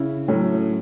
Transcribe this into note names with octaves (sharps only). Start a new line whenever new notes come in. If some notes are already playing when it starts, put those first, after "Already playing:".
Already playing: C#3 E4
A2 F#3 A3 C#4